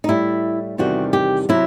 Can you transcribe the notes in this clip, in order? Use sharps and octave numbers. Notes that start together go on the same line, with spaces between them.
D#4
A2 G3 E4
E2 C3 D#3 G3 F#4
G4
C3 F#3 E4